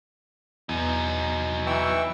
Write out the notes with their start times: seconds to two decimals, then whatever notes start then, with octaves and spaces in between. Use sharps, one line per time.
0.69 E2 F#3 D#4
1.67 E3 G5 C#6 E6